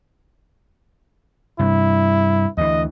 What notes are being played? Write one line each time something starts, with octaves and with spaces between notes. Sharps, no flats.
G2 C3 E4
D2 E3 D#5